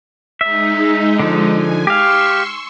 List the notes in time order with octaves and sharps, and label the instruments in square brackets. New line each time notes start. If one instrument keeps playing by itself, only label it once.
[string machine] G#3 D#4 [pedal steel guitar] E5
[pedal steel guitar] D3 F3
[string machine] G#5
[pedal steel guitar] G4 F5 [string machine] C6 C#6 E6